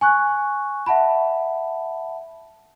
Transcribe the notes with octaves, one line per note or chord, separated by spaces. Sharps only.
G#5 C#6 F#6
E5 F#5 A5 B5